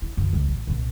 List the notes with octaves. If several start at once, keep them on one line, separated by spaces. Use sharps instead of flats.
E4
F#2 E3
C#2 F3
A1
C2 A#2